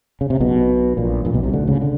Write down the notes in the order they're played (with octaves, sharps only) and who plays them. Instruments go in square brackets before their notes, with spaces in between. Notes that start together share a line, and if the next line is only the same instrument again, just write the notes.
[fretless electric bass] C#3
C3
B1 B2
A#1 A#2
A#1 A#2
B1 B2
C2 C3
D2 D3
C#2 C#3
D3